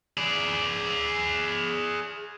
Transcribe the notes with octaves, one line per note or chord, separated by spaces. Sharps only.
G#4 D5